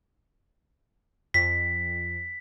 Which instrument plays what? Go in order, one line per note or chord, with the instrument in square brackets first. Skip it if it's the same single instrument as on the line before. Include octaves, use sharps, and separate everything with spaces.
[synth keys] F2 [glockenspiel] B6